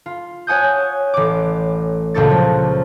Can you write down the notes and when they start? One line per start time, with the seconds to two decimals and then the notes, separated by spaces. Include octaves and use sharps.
0.06 F4
0.47 C#5 F#5 G#5 D#6 G6
1.14 A1 D6
2.14 C#2 A#2 G4 A4 C#6 A6
2.30 F3 F#3